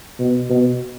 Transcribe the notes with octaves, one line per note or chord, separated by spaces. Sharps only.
B2
B2